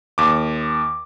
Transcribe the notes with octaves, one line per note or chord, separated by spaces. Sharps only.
D#2 D6